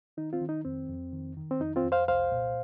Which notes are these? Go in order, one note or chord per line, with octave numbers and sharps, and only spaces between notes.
D#3 D#4
C4 F4
D#3
D#4
F2 C4
F2
D#3
D#3
C4
F2 D#4
C4 F4
F2
C5 F5
C2 C5 F5
A#2